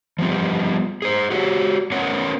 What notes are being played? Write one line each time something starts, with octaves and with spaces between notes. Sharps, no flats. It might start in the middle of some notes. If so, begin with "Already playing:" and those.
F3 G3 B3 F4
G#4 C5
F#4 G4 C#5
B3 C#4 A#4 C#5 F#5